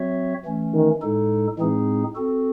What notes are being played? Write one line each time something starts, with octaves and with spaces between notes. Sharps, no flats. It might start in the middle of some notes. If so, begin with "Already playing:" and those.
Already playing: F#3 C4 F#4 C#5 E5
E3 A3 C#4
D#3
A2 G#3 D#4 A4
A2 E3 G#3 C4 D#4 G#4
C4 F#4 A4